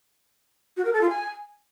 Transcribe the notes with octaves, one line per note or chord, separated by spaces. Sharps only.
F#4
A#4
A4
F4
G#5